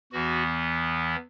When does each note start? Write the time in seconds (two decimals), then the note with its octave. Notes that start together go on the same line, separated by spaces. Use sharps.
0.12 E2 E3 B3 F#4